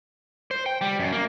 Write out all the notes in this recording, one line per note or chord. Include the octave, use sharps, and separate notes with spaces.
C5
G5
G3
F#2
A#3